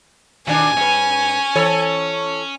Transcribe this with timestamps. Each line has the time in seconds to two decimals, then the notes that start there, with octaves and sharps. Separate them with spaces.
0.48 D#2 B2 D#3 D4 G#5
0.77 G2 C#4 B4
1.56 E3 A4 C#5